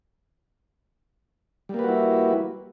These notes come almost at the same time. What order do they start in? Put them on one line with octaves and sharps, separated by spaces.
G3 A#3 B4 F#4 E4